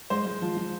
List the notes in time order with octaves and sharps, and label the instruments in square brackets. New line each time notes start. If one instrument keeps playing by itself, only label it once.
[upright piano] G#3 [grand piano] C5 C6
[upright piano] G#3
F3
F3